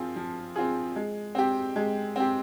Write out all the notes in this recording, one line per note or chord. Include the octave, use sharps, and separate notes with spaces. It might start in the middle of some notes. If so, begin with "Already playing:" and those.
Already playing: F3 C4 F4 G#4
F3
C4 F4 G#4
G#3
C4 G4
G#3
C4 G4